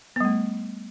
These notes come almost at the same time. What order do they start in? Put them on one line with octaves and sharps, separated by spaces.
B3 G3 A3